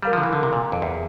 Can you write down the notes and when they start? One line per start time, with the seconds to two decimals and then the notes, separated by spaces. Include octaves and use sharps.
0.02 G3 A#4 F5 A#5
0.13 F3
0.17 D3
0.23 E3
0.33 D3
0.43 C3
0.53 A#2
0.72 F2
0.82 E2